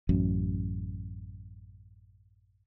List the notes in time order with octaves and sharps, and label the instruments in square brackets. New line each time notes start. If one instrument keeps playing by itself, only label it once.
[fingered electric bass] A1 F#2